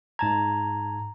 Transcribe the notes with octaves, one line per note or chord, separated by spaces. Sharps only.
G#2 A5 A#5 G#6